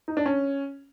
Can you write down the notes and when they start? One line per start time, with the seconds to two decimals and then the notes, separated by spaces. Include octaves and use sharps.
0.08 D#4
0.17 D4
0.26 C#4